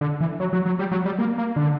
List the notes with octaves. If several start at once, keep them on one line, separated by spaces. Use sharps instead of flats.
D3
E3
F#3
F#3
F#3
G3
F#3
G3
A#3
A#3
D3